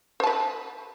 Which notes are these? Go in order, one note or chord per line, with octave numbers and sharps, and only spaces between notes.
B4 C5 A5